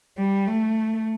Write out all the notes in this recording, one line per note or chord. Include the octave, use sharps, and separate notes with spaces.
G3
A3